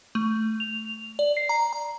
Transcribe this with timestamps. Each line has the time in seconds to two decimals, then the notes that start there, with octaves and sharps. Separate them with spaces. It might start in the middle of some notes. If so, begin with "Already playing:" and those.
0.15 A3
0.60 F7
1.19 D5
1.37 C7
1.49 A#5
1.73 A#5